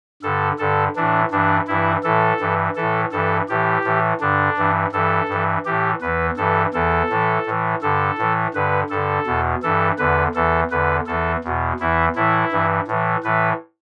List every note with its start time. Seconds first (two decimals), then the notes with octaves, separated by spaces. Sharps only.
0.23 G2 D3 A4
0.59 G2 D3 A4
0.96 A2 E3 D4
1.31 G2 E3 D4
1.67 G2 E3 E4
2.04 A2 E3 A4
2.40 G2 E3
2.76 A2 E3 A4
3.12 G2 E3 A4
3.49 A2 E3 G4
3.84 A2 E3
4.21 G2 D3 D4
4.57 G2 E3
4.92 G2 E3 A4
5.29 G2 E3
5.65 A2 E3 G4
6.01 E2 E3 B4
6.37 G2 E3 A4
6.74 E2 E3 A4
7.09 A2 E3
7.46 A2 E3
7.82 G2 D3 A4
8.18 A2 E3
8.54 G2 D3 B4
8.90 G2 D3 A4
9.26 E2 B2
9.63 G2 E3 A4
9.98 E2 D3 B4
10.34 E2 E3 A4
10.71 E2 D3 B4
11.07 E2 E3 A4
11.44 E2 B2
11.79 E2 E3 E4
12.15 A2 E3 E4
12.52 G2 E3
12.87 A2 E3
13.24 A2 E3 B4